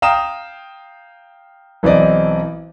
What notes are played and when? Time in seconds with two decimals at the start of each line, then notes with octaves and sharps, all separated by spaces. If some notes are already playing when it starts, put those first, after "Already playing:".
0.02 F5 G5 A#5 D#6 F6 E7
1.83 B1 E3 C4 D5 D#5